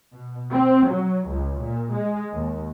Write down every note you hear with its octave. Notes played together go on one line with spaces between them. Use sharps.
B2
C4
F#3
C#2
A#2
G#3
D#2